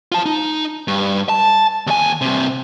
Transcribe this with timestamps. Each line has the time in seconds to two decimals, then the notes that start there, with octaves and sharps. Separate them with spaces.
0.12 F4 A5
0.26 D#4
0.88 G2
1.29 A5
1.87 D#2 G#5
2.21 G2 C3